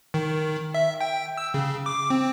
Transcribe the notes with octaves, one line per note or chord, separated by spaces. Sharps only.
D#3
E5
G5
E6
C#3
D6
C4